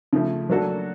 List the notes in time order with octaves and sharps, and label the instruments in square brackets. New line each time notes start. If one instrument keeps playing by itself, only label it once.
[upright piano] C#3 F3 A3
F#3 A#3 D4 F#4 A4